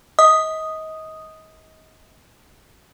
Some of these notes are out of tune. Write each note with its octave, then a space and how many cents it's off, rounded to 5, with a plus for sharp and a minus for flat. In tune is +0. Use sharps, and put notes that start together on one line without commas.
D#5 +30 D#6 +0